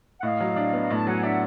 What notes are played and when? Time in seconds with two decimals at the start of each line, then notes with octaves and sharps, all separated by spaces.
0.20 F#5
0.23 A2 D#5 F5
0.40 F#3
0.56 D4
0.73 B3
0.82 A#5
0.90 A2 A5
1.07 F#3 F#5 G#5
1.23 D4 E5 F#5